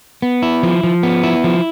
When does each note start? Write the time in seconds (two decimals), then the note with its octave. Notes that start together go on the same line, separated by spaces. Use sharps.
0.22 B3
0.43 E4
0.63 F3
0.83 F3
1.03 B3
1.24 E4
1.44 F3